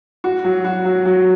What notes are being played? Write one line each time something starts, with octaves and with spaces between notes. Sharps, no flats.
F#4
F#3
F#4
F#3
F#3